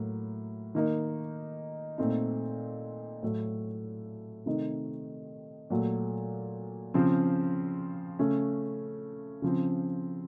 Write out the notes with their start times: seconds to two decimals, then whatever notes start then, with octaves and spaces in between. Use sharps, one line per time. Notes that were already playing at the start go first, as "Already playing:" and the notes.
Already playing: A2 F#3 A#3
0.75 D#3 A#3 D#4
1.98 A#2 A3 C4 D#4
3.23 A2 F#3 A3
4.46 C3 D#3 A3 C4 D#4
5.70 A#2 F#3 A3
6.94 C#3 F3 C4
8.19 C#3 A3 C#4
9.42 C#3 F3 C4